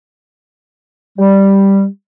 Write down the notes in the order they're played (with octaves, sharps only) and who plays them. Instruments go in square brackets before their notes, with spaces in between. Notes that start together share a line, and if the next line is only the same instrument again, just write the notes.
[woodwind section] G3